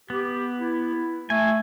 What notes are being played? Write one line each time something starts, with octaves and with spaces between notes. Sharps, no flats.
B3 G4
E4
A3 G#5